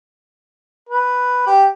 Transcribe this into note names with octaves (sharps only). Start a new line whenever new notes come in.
B4
G4